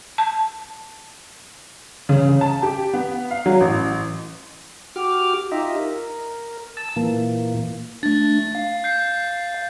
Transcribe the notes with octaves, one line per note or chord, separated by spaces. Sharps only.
A5
C#3
C#3
A5
G4
B3
F5
F#3
A1
F#4 G4 D6 F6
D#4 F4 G4 D#5 E5
A#4
A5 E6
A#2 E3 A#3
A3 D4 A6
F5
G6 C7